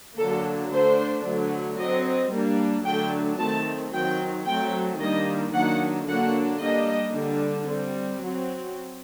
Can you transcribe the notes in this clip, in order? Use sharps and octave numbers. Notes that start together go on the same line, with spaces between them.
D3 F#3 A#3 D4 A4
D3 A3 D4 C5
D3 F#3 A3
F#3 C4 D#5
G3 A#3 D4
D3 F#3 A3 D4 G5
D#3 A3 C4 A5
D#3 F#3 C4 G5
F#3 A3 C4 G5
D#3 G3 A#3 D4 D#5
D#3 F#3 A#3 D4 F#5
D3 F#3 A#3 D4 F#5
G3 A#3 D4 D#5
D3 G3 D4
G3 C4
F#3 C4